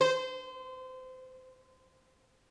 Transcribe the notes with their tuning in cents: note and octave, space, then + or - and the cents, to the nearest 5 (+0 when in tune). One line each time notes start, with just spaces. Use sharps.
C5 -25